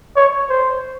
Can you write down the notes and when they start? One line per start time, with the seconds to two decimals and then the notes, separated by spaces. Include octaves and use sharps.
0.16 C#5
0.49 C5